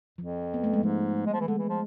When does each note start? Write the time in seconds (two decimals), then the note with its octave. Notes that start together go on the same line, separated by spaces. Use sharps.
0.18 F2 F3
0.54 B3
0.64 A3
0.73 G#3
0.83 G#2 F3
1.26 G#3
1.33 F3
1.40 E3
1.48 D3 G#3
1.58 E3
1.69 F3